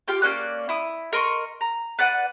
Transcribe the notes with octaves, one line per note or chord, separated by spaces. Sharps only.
F4 G4 G5 D6
A#3 C#4 D5 F#6
E4 D#6
A#4 D#5 C6 C#6
A#5
B4 D5 F#5